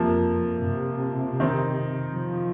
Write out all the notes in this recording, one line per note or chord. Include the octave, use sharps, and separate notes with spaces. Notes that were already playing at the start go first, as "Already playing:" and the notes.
Already playing: F2 C3 F3 A#3
C3
D#3 C4 D#4
F3